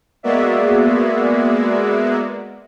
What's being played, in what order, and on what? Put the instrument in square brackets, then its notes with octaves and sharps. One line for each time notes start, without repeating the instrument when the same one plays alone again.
[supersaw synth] G#3 A#3 B3 F#4 D5 E5